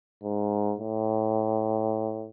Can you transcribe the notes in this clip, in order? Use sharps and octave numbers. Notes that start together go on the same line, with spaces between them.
G#2
A2